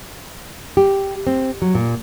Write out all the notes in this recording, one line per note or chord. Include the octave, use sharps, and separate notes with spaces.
G4
C4
F#3
A#2